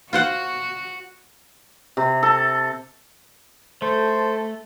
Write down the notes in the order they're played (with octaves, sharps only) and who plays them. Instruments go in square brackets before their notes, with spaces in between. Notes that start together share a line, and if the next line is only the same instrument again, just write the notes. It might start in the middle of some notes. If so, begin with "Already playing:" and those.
[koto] F4 C5 F#5 [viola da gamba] F#4
[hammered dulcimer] C3
A4
[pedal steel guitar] A3 [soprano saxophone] A4 [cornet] C5